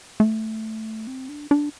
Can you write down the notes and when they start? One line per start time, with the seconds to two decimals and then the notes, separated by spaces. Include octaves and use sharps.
0.20 A3
1.07 C4
1.29 D4
1.51 D4